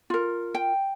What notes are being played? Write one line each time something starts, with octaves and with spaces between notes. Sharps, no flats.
F4 A#4
G5